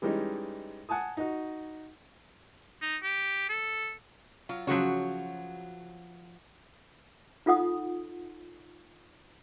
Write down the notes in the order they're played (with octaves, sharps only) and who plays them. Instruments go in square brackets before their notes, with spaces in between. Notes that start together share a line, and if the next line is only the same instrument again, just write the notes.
[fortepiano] E3 G3 G#3 C#4 D#4
F#5 G#5 A5 D#6
D#4 F#4
[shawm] D#4
G4
A4
[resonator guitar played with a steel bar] F#3 F4
[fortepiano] C#3 F#3 [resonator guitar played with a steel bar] F3 F#4 C#5
[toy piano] D#4 F4 A4 F#5 D#6